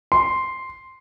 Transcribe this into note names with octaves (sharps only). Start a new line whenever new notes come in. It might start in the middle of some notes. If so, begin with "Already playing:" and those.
C6